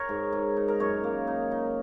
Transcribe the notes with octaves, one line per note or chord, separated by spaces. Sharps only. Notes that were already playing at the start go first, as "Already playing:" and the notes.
Already playing: A#4 C#5
G#2
G#2
D#4
A#4
F#2 C#5
A#3
D#4
D#4